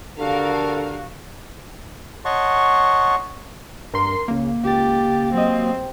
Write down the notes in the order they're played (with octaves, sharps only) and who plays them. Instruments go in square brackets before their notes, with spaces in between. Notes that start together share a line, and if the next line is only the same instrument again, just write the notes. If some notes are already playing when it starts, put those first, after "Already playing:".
[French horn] D3 [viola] F#4 G4 [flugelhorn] A4 [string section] A#4 F5
[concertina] C#5 D#5 F#5 A5 C6 C#6
[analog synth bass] G2 [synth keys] A#4 C6 C7
[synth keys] C#2 C#3 [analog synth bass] A#3
[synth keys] C#2 A6 [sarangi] G4
[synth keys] F#3 D#5 [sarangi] C4